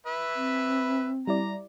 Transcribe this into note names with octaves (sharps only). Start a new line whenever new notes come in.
B4 E5
C4
G3 E4 D5 A#5